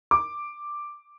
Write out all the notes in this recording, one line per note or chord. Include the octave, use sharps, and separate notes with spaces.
D6